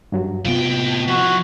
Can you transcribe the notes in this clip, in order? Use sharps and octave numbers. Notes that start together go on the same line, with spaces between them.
G2 F#3
A2 C3 B3 F4 G5
F3 E4 F#4